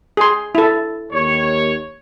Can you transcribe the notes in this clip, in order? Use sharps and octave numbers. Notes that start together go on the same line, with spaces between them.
G#4 C6
E4 A4
D#2 C#5